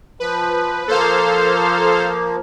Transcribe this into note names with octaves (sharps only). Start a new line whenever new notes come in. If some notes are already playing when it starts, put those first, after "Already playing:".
F3 B4
F3 A#3 A4 C5 F5